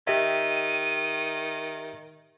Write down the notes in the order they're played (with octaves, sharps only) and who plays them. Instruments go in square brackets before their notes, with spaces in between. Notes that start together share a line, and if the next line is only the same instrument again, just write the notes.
[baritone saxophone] D#3 [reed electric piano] G4 D#5 [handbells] E5 [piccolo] D#7